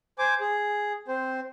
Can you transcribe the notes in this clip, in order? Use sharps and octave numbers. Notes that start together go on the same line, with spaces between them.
C5 G#5 D6
G#4
C4 C5